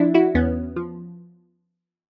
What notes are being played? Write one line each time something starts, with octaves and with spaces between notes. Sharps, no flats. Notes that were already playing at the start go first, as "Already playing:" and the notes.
Already playing: F3 D4 E4
E4 F#4
E2 B3 C#4
F3